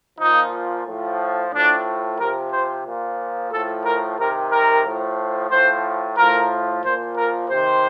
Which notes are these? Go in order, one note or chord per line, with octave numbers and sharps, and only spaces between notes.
A#2 F3 D#4
A2 F3
A2 F3 D4
C3 F3 A#4
C5
A#2 F3
A2 F3 A4
A#4
C3 D#3 A#4
A#4
A2 F3
A2 F3 C5
A2 F3 A#4
A#2 F3 C5
A#4
C3 D#3 C5